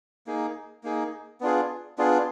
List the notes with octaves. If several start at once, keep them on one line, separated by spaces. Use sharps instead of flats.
A#3 D#4 G#4
A#3 D#4 G#4
B3 D4 F4 G#4
B3 D4 F4 G#4